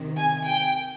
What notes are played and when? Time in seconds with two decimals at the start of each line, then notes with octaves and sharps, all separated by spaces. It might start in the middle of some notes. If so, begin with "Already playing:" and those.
Already playing: C3 D#3
0.17 G#5
0.47 G5